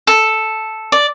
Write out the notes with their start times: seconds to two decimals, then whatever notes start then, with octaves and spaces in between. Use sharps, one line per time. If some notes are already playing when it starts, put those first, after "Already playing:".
0.07 A4
0.92 D5